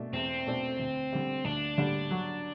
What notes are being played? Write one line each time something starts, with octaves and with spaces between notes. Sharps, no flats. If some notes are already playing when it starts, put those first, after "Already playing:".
Already playing: B2 A3 D4
E2 C4
B2 A3 D4 A4
D2
D3 G3
D2 D4
D3 G3
F#3